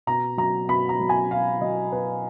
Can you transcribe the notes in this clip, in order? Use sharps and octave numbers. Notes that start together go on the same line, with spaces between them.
B2 A#5
F#3 A#5
B2 B5
A#5
F#3
G#5
B2 F5
F#3 D#5
B2 B4